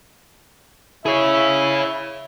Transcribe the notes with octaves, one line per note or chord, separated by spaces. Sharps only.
E4 G#4 C#5 E5